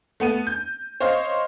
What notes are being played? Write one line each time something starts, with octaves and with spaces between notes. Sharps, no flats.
A3 B3 D#7
G6
C5 C#5 D#5 F5 C6